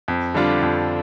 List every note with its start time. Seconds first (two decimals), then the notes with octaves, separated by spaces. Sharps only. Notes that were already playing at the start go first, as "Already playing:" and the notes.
0.08 F2
0.34 D3 G3 D4 F4
0.62 F2